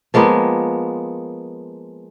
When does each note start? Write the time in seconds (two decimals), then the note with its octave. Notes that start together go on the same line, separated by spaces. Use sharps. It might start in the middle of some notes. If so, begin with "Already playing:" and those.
0.14 F3 G#3 A#3 B3